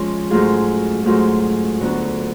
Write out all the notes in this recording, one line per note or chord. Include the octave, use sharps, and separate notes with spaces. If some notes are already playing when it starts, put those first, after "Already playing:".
Already playing: F3 G#3 C#4
G#2 F#3 A3 F4 G#4
G#2 F#3 A3 F4 G#4
D2 D3 F#3 B3 F#4